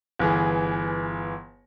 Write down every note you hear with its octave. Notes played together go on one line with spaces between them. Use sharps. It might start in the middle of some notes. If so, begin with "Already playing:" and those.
G1 E3 G#4